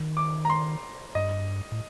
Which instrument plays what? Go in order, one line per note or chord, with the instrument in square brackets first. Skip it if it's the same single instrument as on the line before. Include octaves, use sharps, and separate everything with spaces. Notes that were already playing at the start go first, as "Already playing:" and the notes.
Already playing: [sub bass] D#3
[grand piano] D6
A#5
C6
[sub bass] G2 [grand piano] D#5
[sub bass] A2